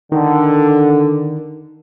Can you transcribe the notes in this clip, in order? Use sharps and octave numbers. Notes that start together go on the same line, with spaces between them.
D3 D#3 D#4